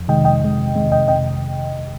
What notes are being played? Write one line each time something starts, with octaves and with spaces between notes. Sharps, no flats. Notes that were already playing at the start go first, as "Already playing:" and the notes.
Already playing: F2
C3 D#3 G#3 D#5 G5
F2 D#5 G5
C3 D#3 G#3
F2
C3 D#3 G#3
F2 D#5 G5
C3 D#5 G5